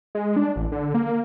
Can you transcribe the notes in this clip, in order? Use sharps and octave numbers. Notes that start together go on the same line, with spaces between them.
G#3
D4
A1
D3
A#3